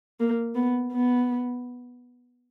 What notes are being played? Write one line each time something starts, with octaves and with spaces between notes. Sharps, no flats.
A#3
B3
B3